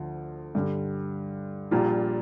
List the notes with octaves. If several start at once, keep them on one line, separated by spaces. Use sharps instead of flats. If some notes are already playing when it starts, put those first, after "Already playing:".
Already playing: D2 D3 F3
G2 D3 G3
A#1 A#2 G3 A#3 F4